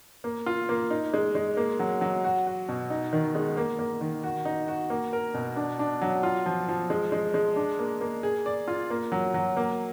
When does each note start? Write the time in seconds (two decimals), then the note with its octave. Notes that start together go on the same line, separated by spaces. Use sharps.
0.24 A#3
0.46 F4
0.69 A#3
0.90 D#4
1.14 G#3
1.35 G#3
1.57 A#3
1.79 F#3
2.01 F#3
2.24 F#4
2.47 F#4
2.69 B2
2.90 D#4
3.13 D#3
3.35 G#3
3.57 A#3
3.79 A#3
4.01 D#3
4.24 F#4
4.45 D#4
4.68 F#4
4.90 A#3
5.13 A#4
5.34 B2
5.56 D4
5.79 D4
6.01 F#3
6.23 F4
6.46 F3
6.69 F3
6.90 G#3
7.12 G#3
7.34 G#3
7.56 D4
7.79 A#3
8.01 A#3
8.23 G#4
8.46 D5
8.68 F4
8.90 A#3
9.12 F#3
9.34 F#3
9.57 A#3